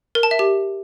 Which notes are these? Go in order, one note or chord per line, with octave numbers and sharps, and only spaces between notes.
A#4
A5
E5
G4